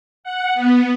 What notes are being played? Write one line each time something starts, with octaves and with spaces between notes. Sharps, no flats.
F#5
B3